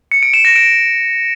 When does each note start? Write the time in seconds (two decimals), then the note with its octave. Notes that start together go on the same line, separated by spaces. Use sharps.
0.12 C#7
0.23 D7
0.34 E7
0.45 A#6
0.56 D7